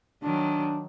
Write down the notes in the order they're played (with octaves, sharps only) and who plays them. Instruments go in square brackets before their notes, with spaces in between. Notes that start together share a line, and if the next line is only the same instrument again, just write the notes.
[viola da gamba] D#3 F#3 [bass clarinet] D4